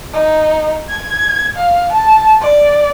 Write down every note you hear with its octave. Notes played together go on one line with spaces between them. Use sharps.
D#4
G#6
F5
A5
D5